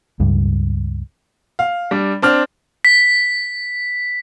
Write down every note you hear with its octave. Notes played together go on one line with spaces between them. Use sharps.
C#2 G2
F5
G3 D4
C4 D4 F6
B6